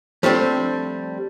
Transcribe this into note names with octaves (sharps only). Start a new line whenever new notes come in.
F3 G3 A3 C4 D4